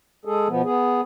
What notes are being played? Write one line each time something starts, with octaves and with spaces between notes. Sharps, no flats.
G#3 G#4 A4
B2 F3 B3
B3 G#4